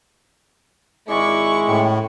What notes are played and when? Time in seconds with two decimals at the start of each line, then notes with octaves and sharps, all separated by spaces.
1.08 G#1 G#3 E4 D5 F#5 C#6
1.67 A2 C#4 G5 B5